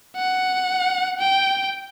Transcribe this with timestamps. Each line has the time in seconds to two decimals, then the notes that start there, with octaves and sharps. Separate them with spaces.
0.17 F#5
1.20 G5